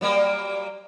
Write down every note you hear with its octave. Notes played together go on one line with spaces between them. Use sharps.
F#3 G3 A#3